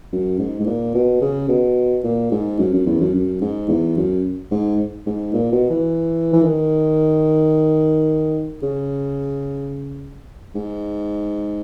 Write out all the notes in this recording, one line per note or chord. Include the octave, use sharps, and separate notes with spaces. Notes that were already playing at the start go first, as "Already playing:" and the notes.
F#2
G#2
G#2
A#2
B2
C#3
B2
A#2
G#2
F#2
F#2
E2
F#2
F#2
G#2
E2
F#2
G#2
G#2
A#2
B2
E3
E3
D#3
C#3
G#2